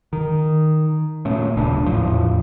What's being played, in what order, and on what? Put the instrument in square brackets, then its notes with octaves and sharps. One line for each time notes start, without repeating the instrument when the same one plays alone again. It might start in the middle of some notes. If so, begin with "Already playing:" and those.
[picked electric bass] D#3
A#2 A3 C#4
D#1 B1 C#3 D4
E2 A2 F3